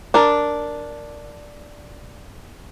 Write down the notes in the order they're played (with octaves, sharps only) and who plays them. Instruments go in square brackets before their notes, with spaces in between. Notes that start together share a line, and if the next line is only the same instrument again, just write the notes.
[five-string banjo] D4 A#4